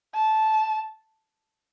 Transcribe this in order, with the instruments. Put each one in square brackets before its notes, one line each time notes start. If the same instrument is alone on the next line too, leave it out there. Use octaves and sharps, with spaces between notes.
[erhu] A5